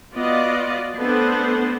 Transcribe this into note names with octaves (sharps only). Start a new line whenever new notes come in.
B3 F4 F#4 D5 D#5
A3 B3 C4 D4 A4 C5